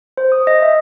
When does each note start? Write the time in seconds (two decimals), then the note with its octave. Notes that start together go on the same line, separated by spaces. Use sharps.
0.17 C5
0.32 D#6
0.47 D#5
0.62 E5